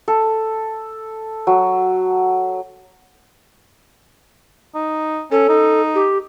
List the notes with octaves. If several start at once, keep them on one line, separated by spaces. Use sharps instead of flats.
A4
F#3
D#4
C#4 A4
D#4
G4